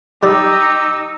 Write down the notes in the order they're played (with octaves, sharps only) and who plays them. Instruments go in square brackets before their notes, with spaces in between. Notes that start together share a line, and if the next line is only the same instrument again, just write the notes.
[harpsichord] G3 D5 [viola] D#4 [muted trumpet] G4 [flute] E6